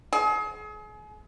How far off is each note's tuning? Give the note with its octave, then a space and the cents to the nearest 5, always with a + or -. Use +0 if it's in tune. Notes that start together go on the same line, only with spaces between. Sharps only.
G#4 +35